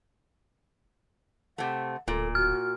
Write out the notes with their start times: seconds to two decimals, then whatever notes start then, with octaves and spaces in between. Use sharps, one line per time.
1.58 C3 A3 F#5
2.08 D1 A#2 A4
2.35 F#4 F6